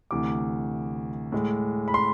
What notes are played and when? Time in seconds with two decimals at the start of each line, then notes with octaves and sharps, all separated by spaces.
0.11 D2 C3 E3 D6
1.32 A2 G#3
1.88 B5
1.94 C6